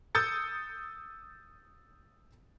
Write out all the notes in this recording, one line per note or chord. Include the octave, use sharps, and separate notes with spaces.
D#6 E6 G6 A6 C#7